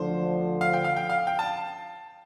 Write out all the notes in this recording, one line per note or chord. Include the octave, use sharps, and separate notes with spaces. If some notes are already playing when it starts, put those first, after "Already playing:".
Already playing: D2 D3 F3 C5
F5
G5
F5
G5
F5
G5
A5